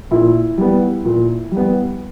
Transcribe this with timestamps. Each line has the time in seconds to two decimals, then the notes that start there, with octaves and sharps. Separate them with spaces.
0.11 A#2 E4
0.58 G3 B3
1.05 A#2
1.51 G3
1.57 B3